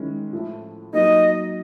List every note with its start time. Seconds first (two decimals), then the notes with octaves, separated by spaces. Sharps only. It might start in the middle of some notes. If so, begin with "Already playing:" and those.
Already playing: D#3 G#3 C#4 E4
0.32 A2 F3 A3
0.93 F#3 A#3 D#4 D#5